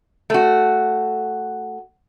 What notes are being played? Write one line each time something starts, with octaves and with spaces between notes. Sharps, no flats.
A3 F#4